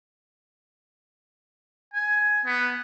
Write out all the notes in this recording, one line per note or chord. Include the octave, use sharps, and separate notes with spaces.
G#5
B3